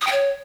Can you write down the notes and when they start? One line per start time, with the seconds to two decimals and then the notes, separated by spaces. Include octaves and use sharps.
0.01 D#6
0.07 G5
0.12 C#5